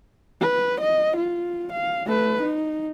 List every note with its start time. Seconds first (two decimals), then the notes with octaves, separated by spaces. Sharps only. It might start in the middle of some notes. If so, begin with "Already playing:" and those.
0.41 B4
0.80 D#5
1.16 F4
1.72 F5
2.06 A3 B4
2.42 D#4